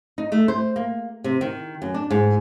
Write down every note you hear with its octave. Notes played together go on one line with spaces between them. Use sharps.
D#4
A3
C5
A#3
C3
D#3
F#2
D4
G#2